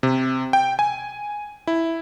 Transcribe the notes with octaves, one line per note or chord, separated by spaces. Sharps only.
C3
G5
G#5
E4